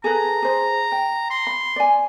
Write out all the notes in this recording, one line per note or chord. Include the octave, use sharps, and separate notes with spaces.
G#4 A4 B4 A#5
G#4 C5
G5
C6
B5
D5 G#5